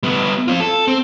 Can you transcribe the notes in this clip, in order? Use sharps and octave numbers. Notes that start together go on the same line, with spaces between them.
G3 B3
C4 F4
A4
C4